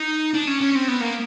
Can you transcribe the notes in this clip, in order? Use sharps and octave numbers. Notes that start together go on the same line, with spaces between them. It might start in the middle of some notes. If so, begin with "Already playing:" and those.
Already playing: D#4
D4
C#4
C#4
C4
B3
A#3